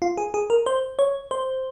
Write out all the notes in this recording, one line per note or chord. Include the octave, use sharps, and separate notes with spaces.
F4
G#4
G#4
A#4
C5
C#5
C5